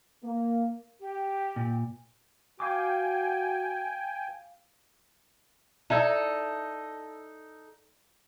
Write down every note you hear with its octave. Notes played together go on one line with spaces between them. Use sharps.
A#3
G4
A#2
F#4 F5 G5 G#5 D6
D#4 E4 A4 D5 E5